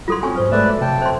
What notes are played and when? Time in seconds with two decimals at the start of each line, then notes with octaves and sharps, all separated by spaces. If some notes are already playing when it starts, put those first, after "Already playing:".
0.08 F#3 F4 A4 C6
0.23 C4 C#4 G5 G#5 C#6
0.36 G#2 C5 F6
0.52 G#3 A3 A4 B4 D5 E5
0.81 F2 C3 G5 A5
1.02 C5 E5 C6